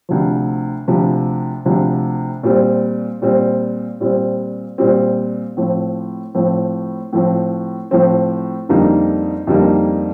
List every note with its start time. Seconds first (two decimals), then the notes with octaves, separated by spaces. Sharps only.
0.09 D2 C3 F3
0.88 D2 C3 F3
1.65 D2 C3 F3
2.43 A#2 G3 C4
3.22 A#2 G3 C4
4.01 A#2 G3 C4
4.78 A#2 G3 C4
5.57 A2 F3 C4
6.35 A2 F3 C4
7.13 A2 F3 C4
7.91 A2 F3 C4
8.69 F2 D3 G3 A#3 D#4
9.47 F2 D3 G3 A#3 D#4